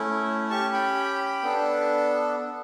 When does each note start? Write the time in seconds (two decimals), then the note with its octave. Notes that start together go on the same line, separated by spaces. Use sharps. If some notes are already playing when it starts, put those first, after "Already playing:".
Already playing: A3 C#4 E4
0.50 C#4 G4 A5 C#6
0.72 G5 B5
1.42 B3 D4 A4